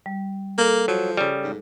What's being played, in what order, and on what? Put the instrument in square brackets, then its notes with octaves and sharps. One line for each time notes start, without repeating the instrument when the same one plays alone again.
[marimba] G3
[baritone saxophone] A#3 [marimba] A4
[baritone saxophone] F3 [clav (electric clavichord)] F#3
[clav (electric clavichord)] C#3 G3
[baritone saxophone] G#2